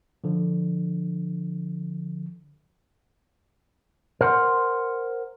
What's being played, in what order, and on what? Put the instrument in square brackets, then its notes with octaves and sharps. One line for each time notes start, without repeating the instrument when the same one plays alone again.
[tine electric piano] D3 F3
[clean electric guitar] A#4 C5 F#5 B5 C6